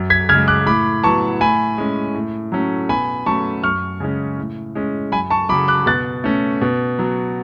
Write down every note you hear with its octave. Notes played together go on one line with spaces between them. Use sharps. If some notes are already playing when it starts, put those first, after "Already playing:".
Already playing: F#2
G#6 B6
C#3 G#3 F6 G#6
D6 F#6
A2 B5 D6
F#3 B3 A5 C#6
A2 G#5 B5
G#3 C#4
A2
F#3 A3 C#4
B2 G#5 B5
F#3 A3 C#4 A5 C#6
F#2 C#6 F6
C#3 G#3 C#4
A2
G#3 C#4
F#2 G#5 B5
A5 C#6
C#3 F#3 B5 D6
D6 F#6
B2 F#6 A6
A3 C#4
B2
F#3 B3